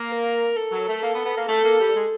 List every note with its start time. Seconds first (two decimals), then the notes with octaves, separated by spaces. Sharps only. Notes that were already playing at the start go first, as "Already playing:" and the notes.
Already playing: A#3
0.10 A#4
0.57 A4
0.72 F#3
0.88 A3
1.03 A#3
1.14 B3
1.25 B3
1.37 A#3
1.48 A3 A4
1.64 A#3
1.80 G3
1.95 G#3